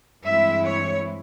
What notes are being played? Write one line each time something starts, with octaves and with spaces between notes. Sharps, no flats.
G2 E3 G#3 C4 E4 E5
C#5